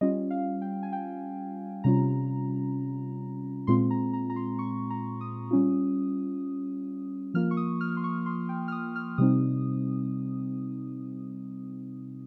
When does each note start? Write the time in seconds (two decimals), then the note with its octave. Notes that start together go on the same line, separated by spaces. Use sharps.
0.01 G3 C#4 F4 D#5
0.30 F5
0.62 G5
0.83 G#5
0.93 G5
1.84 C3 G3 C#4 F4 A#5
3.67 A#2 G#3 C4 F4 C6
3.91 A#5
4.13 A#5
4.30 A#5
4.36 C6
4.59 C#6
4.90 A#5
5.21 D#6
5.51 G3 C#4 F4
7.34 F3 A#3 F4 F6
7.51 C#6
7.57 D#6
7.81 F6
7.97 C6
8.04 C#6
8.26 C6
8.49 G5
8.68 F6
8.72 D#6
8.96 F6
9.18 C3 G3 C4 D#4 D#6